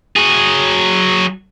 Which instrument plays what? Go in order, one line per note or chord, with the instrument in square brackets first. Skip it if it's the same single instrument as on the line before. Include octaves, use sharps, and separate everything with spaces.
[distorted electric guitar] F#3 G#4